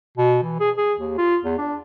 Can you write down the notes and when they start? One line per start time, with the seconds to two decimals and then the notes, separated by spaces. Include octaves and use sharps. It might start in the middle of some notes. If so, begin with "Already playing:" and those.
0.17 B2
0.43 E3
0.60 G#4
0.77 G#4
0.99 D#2
1.18 F4
1.45 E2
1.58 D4